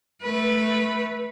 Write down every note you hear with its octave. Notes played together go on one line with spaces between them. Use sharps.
A3 B4